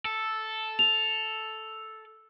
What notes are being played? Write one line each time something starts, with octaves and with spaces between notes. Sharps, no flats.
A4
F7